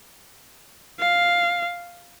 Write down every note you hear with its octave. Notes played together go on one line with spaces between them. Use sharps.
F5